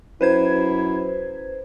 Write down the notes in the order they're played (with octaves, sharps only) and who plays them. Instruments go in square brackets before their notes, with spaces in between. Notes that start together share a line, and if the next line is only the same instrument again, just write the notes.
[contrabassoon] F#2 [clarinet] E4 [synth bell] B4 C5 G#6